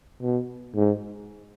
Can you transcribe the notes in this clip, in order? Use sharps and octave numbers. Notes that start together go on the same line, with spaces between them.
B2
G#2